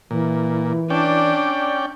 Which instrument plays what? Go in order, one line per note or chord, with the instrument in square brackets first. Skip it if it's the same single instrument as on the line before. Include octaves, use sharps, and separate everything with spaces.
[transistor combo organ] A#2 [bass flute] E3
[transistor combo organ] C#4 D5 G5 [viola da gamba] D4